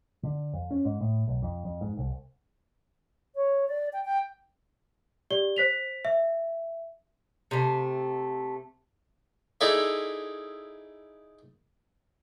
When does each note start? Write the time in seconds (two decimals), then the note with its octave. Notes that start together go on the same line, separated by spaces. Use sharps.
0.23 D3
0.54 F2
0.71 C#4
0.85 G#2
1.01 A2
1.28 B1
1.42 F2
1.65 F2
1.81 G#2
1.98 C2
3.35 C#5
3.68 D5
3.93 G5
4.05 G5
5.31 G4 D5 G7
5.56 C5 B6 F7
6.05 E5
7.51 C3 A3
9.61 D#4 E4 G#4 A4 D5 E5